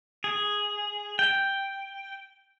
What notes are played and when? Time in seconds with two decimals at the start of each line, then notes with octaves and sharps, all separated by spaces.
0.24 G#4
1.19 G5